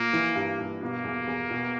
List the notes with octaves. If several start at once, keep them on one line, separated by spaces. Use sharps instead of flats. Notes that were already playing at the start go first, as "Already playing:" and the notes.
Already playing: A#2 A#3
E3
G2
G2
B2 A#3
E2
E2
B2